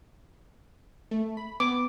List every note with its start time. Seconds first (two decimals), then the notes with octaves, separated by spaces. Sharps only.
1.11 A3
1.37 B5
1.60 B3 D6